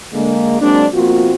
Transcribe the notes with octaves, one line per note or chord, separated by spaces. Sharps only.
D3 G#3 A#3
F#3 G#3 A#3 C4 D4
B2 F3 A#3 C4 F4 F#4